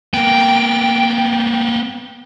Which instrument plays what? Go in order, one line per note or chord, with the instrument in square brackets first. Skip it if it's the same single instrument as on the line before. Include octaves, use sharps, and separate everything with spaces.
[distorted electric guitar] A#3 B3 [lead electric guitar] G5